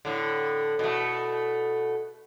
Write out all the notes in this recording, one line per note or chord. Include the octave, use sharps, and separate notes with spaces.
A2 D3
B2 A3